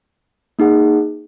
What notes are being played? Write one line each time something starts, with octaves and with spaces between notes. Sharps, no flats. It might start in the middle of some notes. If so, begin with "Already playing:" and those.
A#3 D#4 G#4 F#5